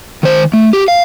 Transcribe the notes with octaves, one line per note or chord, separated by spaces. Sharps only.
D#3 C5
A3
G4
F5